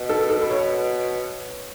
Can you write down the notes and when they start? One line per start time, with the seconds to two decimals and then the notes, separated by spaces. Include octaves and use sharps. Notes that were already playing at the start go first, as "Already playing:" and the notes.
Already playing: B2
0.09 A4
0.30 A4
0.42 B4
0.50 C#5